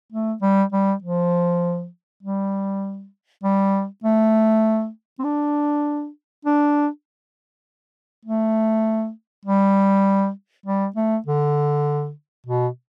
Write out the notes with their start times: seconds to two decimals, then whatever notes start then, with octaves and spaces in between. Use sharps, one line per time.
0.12 A3
0.42 G3
0.73 G3
1.03 F3
2.23 G3
3.43 G3
4.04 A3
5.19 C4
5.24 D4
6.45 D4
8.26 A3
9.45 G3
10.66 G3
10.96 A3
11.27 D3
12.47 B2